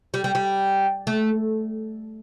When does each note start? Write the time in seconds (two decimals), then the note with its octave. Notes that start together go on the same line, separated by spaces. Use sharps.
0.14 G3
0.24 G3
0.35 G3
1.07 A3